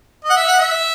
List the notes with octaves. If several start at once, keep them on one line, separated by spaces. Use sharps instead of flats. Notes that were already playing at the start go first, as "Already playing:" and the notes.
D#5
F#5
E5
F#5
E5